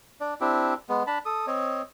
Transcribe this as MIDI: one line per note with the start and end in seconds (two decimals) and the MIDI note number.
0.20 0.34 62
0.20 0.34 74
0.41 0.74 60
0.41 0.74 62
0.41 0.74 64
0.41 0.74 67
0.89 1.03 56
0.89 1.03 59
1.07 1.18 62
1.07 1.18 81
1.07 1.18 83
1.25 1.46 69
1.25 1.46 87
1.47 1.82 60
1.47 1.82 73
1.47 1.82 75